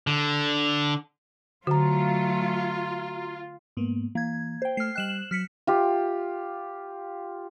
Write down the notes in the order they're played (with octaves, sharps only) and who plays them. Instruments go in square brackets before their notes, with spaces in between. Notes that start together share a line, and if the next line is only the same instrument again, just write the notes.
[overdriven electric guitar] D3
[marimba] D3 [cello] F#3 A3 [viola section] F4 [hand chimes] F#4 A#5
[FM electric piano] G#2 A#3 B3
[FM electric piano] E3 [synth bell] A#3 G#6
[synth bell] C5 G5
[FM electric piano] A3 [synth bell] F6 C7
[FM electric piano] G3 D#5 G5 [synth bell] F#6 E7 F#7
[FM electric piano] F#3 [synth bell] F6 B6 C#7
[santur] F4 G4